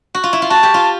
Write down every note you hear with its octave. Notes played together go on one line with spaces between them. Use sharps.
F#4
F4
E4
F4
F#4 A5
G4
F4